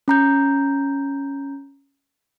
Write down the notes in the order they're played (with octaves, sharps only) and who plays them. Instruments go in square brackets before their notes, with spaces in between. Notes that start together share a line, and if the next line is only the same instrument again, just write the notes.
[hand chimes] C#4 A#5 G6